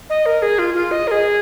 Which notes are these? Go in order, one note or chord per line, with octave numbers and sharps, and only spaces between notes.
D#5
A#4
G#4
F4
F4
D#5
A#4
G#4